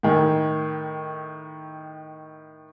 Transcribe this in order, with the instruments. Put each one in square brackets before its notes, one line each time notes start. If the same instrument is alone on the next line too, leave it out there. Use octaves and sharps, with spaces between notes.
[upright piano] A2 D#3